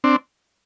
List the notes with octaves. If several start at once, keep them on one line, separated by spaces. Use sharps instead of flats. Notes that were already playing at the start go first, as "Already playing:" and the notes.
C4 D4